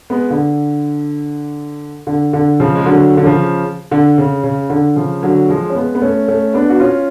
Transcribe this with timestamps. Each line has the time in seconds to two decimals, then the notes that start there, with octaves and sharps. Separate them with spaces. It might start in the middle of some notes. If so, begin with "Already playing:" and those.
0.10 G#3 B3
0.30 D3
2.07 D3
2.33 D3
2.60 C#3 F3
2.75 G#3
2.86 D3 F#3
3.17 D3
3.25 C#3 F3
3.91 D3
4.18 C#3
4.44 C#3
4.70 D3
4.96 C#3 F3
5.23 D3 F#3
5.49 F3 G#3
5.70 C#4
5.75 G#3 B3
5.95 B3
6.02 A3 C#4
6.28 A3 C#4
6.54 B3 D4
6.70 F#4
6.80 C#4 F4